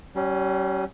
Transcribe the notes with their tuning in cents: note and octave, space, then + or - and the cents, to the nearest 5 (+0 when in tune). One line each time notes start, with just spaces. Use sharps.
G3 -35 C#4 +0